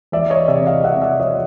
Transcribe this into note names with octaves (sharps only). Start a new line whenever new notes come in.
E2 D5 E5
C#5 D#5
C3 D5 E5
D#5 F5
C3 E5 F#5
D5 E5
F3 C#5 D#5